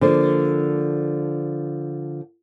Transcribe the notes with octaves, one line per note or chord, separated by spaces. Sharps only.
D3 F3 A#3